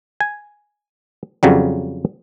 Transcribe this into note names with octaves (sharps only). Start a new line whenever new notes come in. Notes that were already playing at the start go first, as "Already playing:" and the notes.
G#5
F2 C#3 F#3 G3